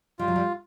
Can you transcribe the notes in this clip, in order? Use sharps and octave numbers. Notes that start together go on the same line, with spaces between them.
G3 F4
F#3
G3